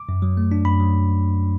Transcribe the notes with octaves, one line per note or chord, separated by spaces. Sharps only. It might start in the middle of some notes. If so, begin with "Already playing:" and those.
Already playing: D6
F#2
F#3
A3
D4
F#2 B5
F#3